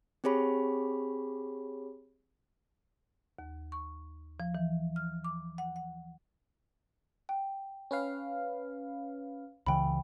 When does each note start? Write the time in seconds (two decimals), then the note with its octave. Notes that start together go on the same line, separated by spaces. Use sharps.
0.24 C4 G4 G#4 C#5 B5
3.39 D#2
3.72 C#6
4.40 F3
4.55 E3
4.96 F6
5.24 D6
5.58 F#5
5.76 F#5
7.29 G5
7.91 C#4 B4 F5
9.66 C#2 C#3 E3 G5 B5